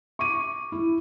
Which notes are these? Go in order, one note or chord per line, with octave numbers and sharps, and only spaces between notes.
C#6 D6 D#7
E4